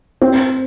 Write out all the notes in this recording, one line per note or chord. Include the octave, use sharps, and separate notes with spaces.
C4